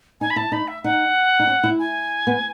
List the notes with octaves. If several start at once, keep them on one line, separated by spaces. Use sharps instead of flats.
D#4 G#5
B5
E4 A5
D#4 B5
E5
D#4 F#5
D#4
C#4
E4
G#5
B3